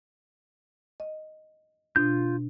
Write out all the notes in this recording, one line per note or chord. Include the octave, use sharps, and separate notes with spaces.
D#5
B2 D4 F4 G6